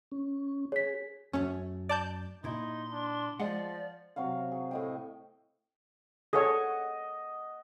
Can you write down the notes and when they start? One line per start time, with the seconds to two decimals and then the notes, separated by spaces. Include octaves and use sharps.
0.12 C#4
0.72 G#4 C#5 B6
1.33 F#2 A3 C#4
1.89 D5 A5 G6
2.44 A#2 D#4 E4 C6
2.90 D4
3.40 F3 G#3 D5 F#5
4.16 C3 F#3 C#5 F5
4.51 G#4
4.71 A2 D#5 G5
6.33 G#4 A4 C#5 D#5 F#5